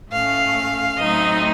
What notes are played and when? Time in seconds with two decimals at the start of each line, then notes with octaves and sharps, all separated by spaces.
0.11 A2 A3 C#4 F5
0.97 A2 F#3 A3 C4 D#4 D#5